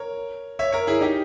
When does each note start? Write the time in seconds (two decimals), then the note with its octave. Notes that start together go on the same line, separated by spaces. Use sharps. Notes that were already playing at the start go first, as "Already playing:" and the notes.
Already playing: A#4 C#5
0.59 C#5 E5
0.72 A#4 C#5
0.87 E4 G#4
1.01 D#4 G4